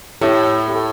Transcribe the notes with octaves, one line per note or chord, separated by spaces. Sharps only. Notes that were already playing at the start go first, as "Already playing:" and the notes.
A2 E4 G4
G4
A4